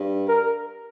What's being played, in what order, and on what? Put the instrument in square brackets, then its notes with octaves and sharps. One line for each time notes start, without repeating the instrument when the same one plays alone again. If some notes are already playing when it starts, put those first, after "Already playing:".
Already playing: [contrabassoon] G2
[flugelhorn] A#4